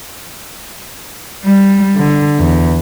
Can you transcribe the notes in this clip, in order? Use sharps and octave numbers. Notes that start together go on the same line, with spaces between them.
G3
D3
E2